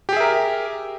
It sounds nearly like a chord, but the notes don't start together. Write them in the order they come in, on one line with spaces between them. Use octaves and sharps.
G4 G#4 E5 A#4